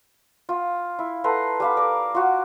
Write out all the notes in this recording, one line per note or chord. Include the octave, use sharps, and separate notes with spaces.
F4
E4
A4 B4 A#5 C6
G3 F5 B5
A#4 D5
F4 F#4